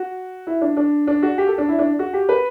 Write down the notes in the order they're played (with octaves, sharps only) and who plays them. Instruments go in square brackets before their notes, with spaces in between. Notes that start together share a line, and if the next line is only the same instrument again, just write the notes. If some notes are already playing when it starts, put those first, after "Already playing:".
Already playing: [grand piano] F#4
E4
D4
D4
D4
F#4
G4
A4
D4
E4
D4
F#4
G4
B4